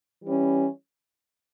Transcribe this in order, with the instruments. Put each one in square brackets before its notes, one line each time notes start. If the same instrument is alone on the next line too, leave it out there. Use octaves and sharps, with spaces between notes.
[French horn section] E3 G3 C#4